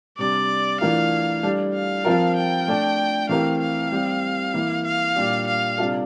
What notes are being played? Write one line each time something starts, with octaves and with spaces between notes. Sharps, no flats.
C3 G3 D4 D5
E3 A3 D4 F4 A#4 F5
G3 D4 A4
F5
F3 C4 F4 A#4
G5
A3 D4 A4
E3 A3 C4 G4 A#4 F5
F5
G3 C4 G4
E3 A#3 E4
F5
A#2 G3 D4 G4
F5
C3 G3 D4 F4 A4